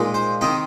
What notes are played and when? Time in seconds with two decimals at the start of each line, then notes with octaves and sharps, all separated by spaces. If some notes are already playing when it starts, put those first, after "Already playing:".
Already playing: A#2 G#3 D#4
0.14 C5
0.41 D#3 C4 D#4 D#5